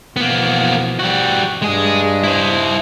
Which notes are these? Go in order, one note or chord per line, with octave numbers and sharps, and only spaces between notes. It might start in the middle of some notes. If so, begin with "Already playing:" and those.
B2 E3 F3 A#3 B3
G3 F#4
G2 G#3 D4 G#4 D#5
E4 C5